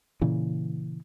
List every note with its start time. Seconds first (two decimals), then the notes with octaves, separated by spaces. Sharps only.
0.21 A#2 C#3 E3